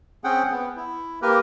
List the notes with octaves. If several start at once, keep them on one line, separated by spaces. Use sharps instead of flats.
C4 C#4 G#4 F#5 G5
B3
E4
A#3 G4 A#4 B4